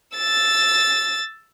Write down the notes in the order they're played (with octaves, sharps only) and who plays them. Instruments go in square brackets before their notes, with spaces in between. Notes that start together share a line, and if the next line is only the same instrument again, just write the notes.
[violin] E6 A6